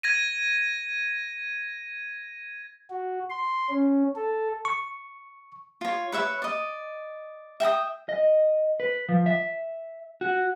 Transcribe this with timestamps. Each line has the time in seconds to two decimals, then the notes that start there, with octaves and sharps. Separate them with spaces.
0.03 G#6 A#6 D#7
2.90 F#4
3.30 C6
3.69 C#4
4.16 A4
4.65 C#6
5.81 F4 C#5
6.12 B4 C#5 E5 B5
6.42 D5 D#5
7.60 E5 G5 A#5 D#6
8.09 D#5
8.80 B4
9.09 F3
9.26 E5
10.21 F#4